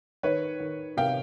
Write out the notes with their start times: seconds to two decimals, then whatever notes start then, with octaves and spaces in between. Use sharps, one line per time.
0.23 D#3 B4 C#5
0.60 D#3
0.97 C3 F5 G5